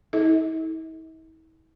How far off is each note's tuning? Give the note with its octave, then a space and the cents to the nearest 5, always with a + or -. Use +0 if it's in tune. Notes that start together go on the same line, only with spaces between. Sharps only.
E4 -45 A4 -30 D#5 +45